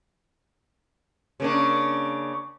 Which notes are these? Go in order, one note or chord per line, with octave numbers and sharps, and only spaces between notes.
C#3 A#3 D4